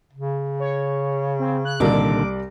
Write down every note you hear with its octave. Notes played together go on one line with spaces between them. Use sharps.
C#3
C#5
C4
F#6
C2 A#2 D3 D#3 G3 D5 D6